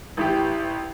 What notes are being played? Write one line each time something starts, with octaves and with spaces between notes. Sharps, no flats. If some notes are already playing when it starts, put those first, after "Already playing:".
A1 E3 G4